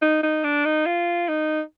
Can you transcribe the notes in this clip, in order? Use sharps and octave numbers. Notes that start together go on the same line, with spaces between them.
D#4
D#4
D4
D#4
F4
D#4